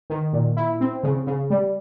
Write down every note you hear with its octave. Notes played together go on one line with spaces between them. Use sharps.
D#3
A#2
E4
C4
C#3
C#3
G3